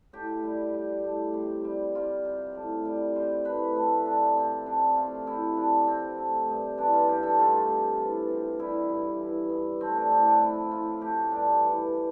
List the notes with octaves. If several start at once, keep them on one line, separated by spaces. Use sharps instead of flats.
A2 G4
G3
G3
A2
C3
G3
G3 F4
C3
A2
G3
G3 C5
A2 B4
A3 A4
C3 D4
F3 C4
C3 D4
A3 F4
C3 E4
F3 D4
C3 C4
A3
G2
E3 D4
F4
G2 G4
A4
A3 F4
C3
E3
C3
G3 E4
G2
E3
G2
A3 C4
D4
A2 C4
D4
F3 E4
A2 F4
A3 G4
G2 D4
E3